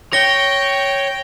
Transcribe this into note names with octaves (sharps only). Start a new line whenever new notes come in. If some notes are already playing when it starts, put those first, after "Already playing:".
C#5 G5 A#6 G7